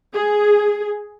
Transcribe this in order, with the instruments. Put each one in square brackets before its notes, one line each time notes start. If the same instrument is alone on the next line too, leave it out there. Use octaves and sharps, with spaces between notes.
[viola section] G#4